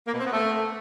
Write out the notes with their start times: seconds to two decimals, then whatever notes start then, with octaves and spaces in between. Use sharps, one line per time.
0.08 A#3
0.14 B2
0.20 C4
0.27 B3
0.33 A3